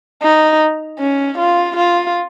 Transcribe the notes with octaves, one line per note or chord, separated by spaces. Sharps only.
D#4
C#4
F4
F4